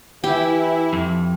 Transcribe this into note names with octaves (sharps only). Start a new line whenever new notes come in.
E3 E4 G4
F2